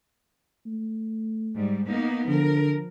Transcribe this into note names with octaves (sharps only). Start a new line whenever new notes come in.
A3
G#2 G3
A#3 B3 D#4
D3 F3 A#4